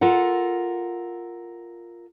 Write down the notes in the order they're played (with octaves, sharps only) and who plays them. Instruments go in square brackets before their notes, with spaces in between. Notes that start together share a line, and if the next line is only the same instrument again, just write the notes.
[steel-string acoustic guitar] F4 A4 A#4 F#5